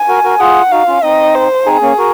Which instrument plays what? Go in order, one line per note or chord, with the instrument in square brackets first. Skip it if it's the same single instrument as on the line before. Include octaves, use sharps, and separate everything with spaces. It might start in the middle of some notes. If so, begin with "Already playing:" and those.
Already playing: [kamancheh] G#5
[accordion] F#4 A#4
F#4 A#4
[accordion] F4 G#4 [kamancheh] F#5
[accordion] D#4 F#4 [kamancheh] F5
[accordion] C#4 F4
[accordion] C4 D#4 [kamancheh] D#5
[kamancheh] C5
[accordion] C4 D#4 [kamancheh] G#4
[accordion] A#3 C#4
F#4 A#4